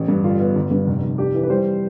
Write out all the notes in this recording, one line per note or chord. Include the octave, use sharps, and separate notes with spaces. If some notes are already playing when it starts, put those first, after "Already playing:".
Already playing: A1
G2
D3 F4
B3
G1
G2
F1
F1
D4 G4
E3
B4
G3 C5